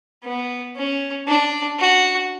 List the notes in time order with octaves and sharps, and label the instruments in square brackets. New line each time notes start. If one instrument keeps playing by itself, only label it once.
[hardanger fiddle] B3
C#4
D4
F#4